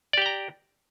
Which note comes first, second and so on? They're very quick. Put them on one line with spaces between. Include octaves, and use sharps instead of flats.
D5 G4 G5 A#5